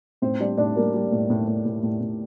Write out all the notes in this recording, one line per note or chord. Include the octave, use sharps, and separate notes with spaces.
A2 C4 C5
G3 D4 D5
A2 D4 D5
G3 A#3 A#4
G3
A2
A2
A2
A2
A2
A2